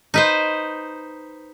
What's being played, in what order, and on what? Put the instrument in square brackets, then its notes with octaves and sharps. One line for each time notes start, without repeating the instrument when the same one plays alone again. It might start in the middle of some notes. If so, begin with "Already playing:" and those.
[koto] D#4 B4 C5